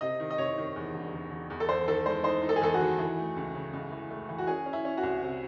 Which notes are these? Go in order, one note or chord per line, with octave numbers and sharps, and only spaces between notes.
C3 D#5
D#3
D#5
C3 C#5
D#3
E2
E1
E1
E1
E2
A4
E2 C5
D#3 A4
G#3 C5
D#4 C5
D#4
A4
G#4
E2 A4
F#4
D#3
E3
A3
C#2
C#3
C#2
E3
A3
E3
F#4
C#4 G#4
C#4
E4
C#4
F#4
C2
C3